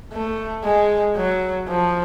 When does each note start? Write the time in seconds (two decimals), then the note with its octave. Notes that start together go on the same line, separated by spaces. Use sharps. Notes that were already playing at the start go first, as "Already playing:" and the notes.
0.13 A3
0.64 G#3
1.16 F#3
1.69 F3